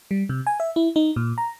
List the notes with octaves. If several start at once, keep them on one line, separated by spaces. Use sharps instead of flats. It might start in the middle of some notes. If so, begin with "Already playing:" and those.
G3
C3
G#5
E5
E4
D#4
A#2
A#5